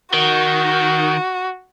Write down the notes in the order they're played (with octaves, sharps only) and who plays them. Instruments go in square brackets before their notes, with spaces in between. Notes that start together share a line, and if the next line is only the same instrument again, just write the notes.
[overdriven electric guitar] D#3 [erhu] F#4